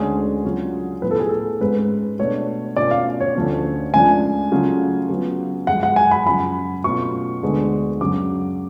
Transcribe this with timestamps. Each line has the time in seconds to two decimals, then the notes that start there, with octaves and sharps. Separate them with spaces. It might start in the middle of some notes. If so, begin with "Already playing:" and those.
Already playing: D2 D3 G#3 C#4 G#4
0.44 C#3 F#3 C#4 F4
1.02 A2 F3 B3 B4
1.11 A4
1.20 G#4
1.28 A4
1.61 G#2 G#3 C#4 B4
2.19 B2 A3 D4 C#5
2.77 B2 A3 C#4 F4 D5
2.91 F5
3.20 C#5
3.35 D2 D3 F3 A3 C#4
3.94 C#2 C#3 F3 A3 D4 G#5
4.52 C#3 F#3 A3 F4
5.09 C#3 F#3 B3 F4
5.67 F#2 F3 G#3 F#5
5.83 F#5
5.96 G#5
6.11 B5
6.25 F#2 C#3 F3 B5
6.84 B2 A3 C#4 F4 C#6
7.43 D2 D3 G#3 B3 D4
8.01 F#2 C#3 F#3 D6